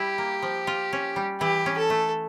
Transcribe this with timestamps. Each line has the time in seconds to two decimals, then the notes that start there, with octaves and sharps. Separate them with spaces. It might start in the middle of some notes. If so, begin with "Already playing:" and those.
Already playing: G3 E4 G4
0.18 A#3
0.42 F3
0.67 F4
0.93 C#4
1.16 G3
1.41 E3 G4
1.66 C#4
1.78 A4
1.90 A3